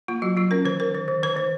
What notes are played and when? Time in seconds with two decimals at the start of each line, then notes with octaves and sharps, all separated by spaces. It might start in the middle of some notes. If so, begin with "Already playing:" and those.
0.08 A#3 F4
0.22 F#3 F#4
0.37 F#3 F4
0.51 C#4 A#4
0.65 D#3 B4
0.80 D#3 A#4
0.95 D#3
1.08 D#3
1.23 D#3 B4
1.37 D#3